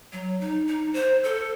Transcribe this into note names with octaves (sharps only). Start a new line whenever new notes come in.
F#3
D#4
D#4
C5
A4